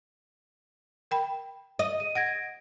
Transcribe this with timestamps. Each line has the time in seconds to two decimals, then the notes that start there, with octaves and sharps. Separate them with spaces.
1.11 A#4 G5 B5
1.79 D#5
2.00 D#7
2.15 F#5 G#6 A#6 D7